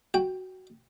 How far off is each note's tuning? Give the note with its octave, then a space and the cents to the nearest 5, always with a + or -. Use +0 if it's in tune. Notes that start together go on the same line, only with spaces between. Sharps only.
F#4 +10 G5 +0